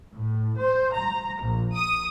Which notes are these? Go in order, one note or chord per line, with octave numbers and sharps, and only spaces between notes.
A2
C5
A#5
A#1
D#6